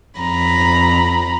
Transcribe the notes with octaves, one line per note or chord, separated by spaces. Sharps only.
F2 A#5 B5